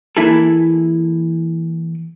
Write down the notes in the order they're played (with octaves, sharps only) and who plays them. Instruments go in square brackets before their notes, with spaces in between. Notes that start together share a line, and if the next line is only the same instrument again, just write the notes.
[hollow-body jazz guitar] E3 A#3 E4 G#4 A4